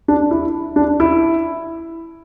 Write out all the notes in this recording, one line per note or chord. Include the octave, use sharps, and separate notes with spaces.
D4
E4
D4
E4